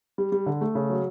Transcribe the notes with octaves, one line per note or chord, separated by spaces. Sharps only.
G3
G3
D3
A3
C#3
F#3